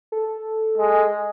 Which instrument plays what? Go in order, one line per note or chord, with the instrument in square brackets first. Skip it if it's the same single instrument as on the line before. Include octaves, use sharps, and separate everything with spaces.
[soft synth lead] A4
[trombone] G#3